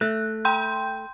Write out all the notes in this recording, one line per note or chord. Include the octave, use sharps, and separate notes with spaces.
A3 F#6
G5 C6 G6